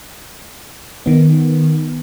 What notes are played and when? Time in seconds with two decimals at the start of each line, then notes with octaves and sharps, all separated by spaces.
1.06 D#3 B3